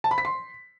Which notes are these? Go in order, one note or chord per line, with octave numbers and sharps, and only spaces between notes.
A5
B5
B6
C6